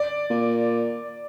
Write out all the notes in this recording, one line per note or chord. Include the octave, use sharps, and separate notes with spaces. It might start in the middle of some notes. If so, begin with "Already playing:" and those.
Already playing: D5
A#2